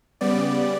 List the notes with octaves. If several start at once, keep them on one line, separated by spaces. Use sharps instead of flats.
C#3 G3 B3 D5